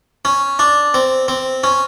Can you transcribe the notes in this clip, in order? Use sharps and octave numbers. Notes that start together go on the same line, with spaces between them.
C#4
D4
C4
C4
C#4